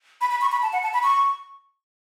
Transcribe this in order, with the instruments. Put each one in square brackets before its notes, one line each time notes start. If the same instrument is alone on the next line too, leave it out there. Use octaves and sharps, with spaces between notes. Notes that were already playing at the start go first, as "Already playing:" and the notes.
[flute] B5
B5
C#6
B5
A5
F#5
A5
B5
C#6